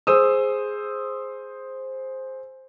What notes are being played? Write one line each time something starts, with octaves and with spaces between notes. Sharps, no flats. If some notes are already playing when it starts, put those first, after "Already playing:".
G#4 C5 D#6 E6